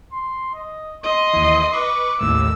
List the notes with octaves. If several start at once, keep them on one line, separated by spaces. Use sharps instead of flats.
C6
D#5
D#5 C6
D#2 E3
B4 C#6 D6
A1 D#2 A2 E6